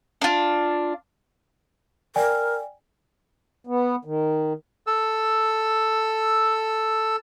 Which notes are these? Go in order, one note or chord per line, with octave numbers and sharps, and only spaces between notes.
D4 F4
A#4 D5 G5 G#5
B3
D#3
A4 E6